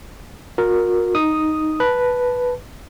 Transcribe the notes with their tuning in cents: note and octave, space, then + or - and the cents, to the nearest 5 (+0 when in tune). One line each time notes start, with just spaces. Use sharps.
F#4 -40 A#4 +0
D#4 +0 D#6 +0
B4 +0 A5 +0